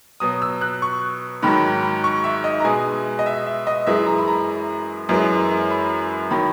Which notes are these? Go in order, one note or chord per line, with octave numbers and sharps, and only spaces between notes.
B2 F#3 D#6
E6
F#6
C#6
G#2 D#3 F#3 B5
C#6
E5
D#5
A#5
B2 G#3 G#5
D#5
E5
E5
D#5
F#2 E3 G#3 E5
A#5
B5
A#5
F#2 E3 G#3
B5
D#3 F#3 B5